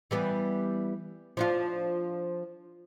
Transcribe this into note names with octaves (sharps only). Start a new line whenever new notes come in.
E3 G3 B3
F3 D4 F4